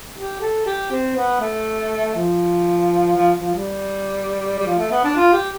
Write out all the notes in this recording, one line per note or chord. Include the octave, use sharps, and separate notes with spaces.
G4
A4
G4
C4
B3
A3
F3
F3
F3
G3
G3
F3
A3
B3
D4
F4
G4